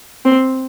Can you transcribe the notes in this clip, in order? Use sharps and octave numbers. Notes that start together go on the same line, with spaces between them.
C4